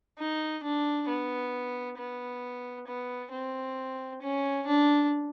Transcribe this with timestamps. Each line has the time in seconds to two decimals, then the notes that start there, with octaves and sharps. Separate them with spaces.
0.19 D#4
0.63 D4
1.08 B3
1.98 B3
2.87 B3
3.32 C4
4.22 C#4
4.66 D4